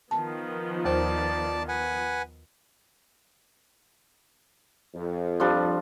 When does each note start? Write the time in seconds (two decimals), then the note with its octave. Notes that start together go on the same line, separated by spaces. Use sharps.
0.11 D#3 F3 B3 A5
0.85 D#2 C5 D5 A5
1.68 B4 F#5 G#5
4.94 F2
5.40 F3 G3 D4